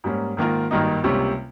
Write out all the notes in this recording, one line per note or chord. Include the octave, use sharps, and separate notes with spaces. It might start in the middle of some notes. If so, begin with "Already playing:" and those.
G#2 G3 A#3 C#4
G#2 D#3 A#3 F4 A#4
G#1 G2 D#3 A#3 D#4
C#2 C3 G3 A#3 C#4